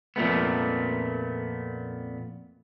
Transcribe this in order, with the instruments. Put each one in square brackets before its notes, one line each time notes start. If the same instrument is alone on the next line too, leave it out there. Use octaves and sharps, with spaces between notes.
[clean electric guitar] F2 A#2 A3 B3